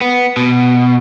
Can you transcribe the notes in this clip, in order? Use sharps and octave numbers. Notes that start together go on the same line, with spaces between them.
B3
B2